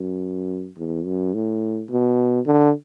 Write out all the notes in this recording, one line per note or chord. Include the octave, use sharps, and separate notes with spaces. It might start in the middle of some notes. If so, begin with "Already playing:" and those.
Already playing: F#2
E2
F#2
A2
B2
D3